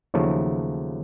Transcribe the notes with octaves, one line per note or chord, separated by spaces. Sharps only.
D#2 C#3 F3 F#3 A3